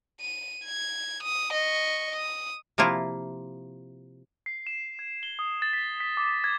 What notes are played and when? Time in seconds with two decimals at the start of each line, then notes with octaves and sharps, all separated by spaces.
0.21 D#7
0.65 G#6
1.23 D#6
1.53 D#5 C#6
2.16 D#6
2.78 C3 F3 A#3 E4 F4
4.46 C7
4.67 E7
4.99 G#6
5.23 G7
5.39 D#6
5.62 A6
5.73 B6
6.00 B6
6.17 D6
6.44 G#6